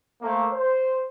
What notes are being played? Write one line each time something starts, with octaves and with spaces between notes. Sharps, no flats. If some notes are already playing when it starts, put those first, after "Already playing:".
A3 A#3 C5
C5